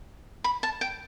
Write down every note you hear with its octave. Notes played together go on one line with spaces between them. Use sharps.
B5
A5
G5